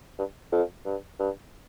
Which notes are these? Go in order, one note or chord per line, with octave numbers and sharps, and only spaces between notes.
G2
F2
G2
G2